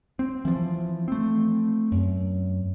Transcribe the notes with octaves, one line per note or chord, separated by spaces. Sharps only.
C4
E3 F3
A3 C4
F#2